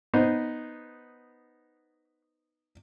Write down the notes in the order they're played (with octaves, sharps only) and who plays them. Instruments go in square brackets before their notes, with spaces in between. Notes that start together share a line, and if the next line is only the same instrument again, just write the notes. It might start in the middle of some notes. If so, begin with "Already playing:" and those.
[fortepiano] B3 D#4 C5